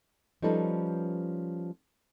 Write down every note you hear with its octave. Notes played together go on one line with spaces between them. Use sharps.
F3 G3 C#4 D#4 A4 B4